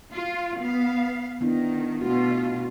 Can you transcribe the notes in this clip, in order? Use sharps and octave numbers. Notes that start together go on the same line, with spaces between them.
F4
B3 F5
D#3 B3 D4 E4
B2 A3 F4 F#4